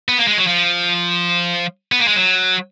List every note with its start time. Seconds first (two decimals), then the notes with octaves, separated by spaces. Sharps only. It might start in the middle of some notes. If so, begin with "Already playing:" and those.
0.09 B3
0.18 A#3
0.28 G#3
0.38 F#3
0.47 F3
1.92 B3
1.99 A#3
2.07 G#3
2.16 F#3